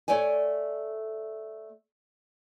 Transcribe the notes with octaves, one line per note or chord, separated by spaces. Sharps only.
A3 C#5 D5 G#5